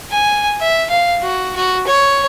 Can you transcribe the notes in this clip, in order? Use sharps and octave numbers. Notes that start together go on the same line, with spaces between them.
G#5
E5
F5
F#4
F#4
C#5